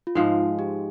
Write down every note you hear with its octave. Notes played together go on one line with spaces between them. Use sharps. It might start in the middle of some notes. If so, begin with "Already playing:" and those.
F4
G#2 F3 G#3 D#4
G4